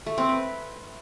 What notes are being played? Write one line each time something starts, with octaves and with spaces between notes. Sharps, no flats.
A3
C4
B4